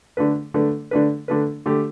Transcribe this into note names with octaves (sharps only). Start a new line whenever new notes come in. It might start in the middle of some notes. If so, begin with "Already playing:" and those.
D3 A3 D4 B4
D3 A3 D4 B4
D3 A3 D4 B4
D3 A3 D4 B4
D3 A3 G4